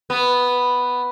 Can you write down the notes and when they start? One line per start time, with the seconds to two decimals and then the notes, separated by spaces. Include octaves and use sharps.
0.10 B3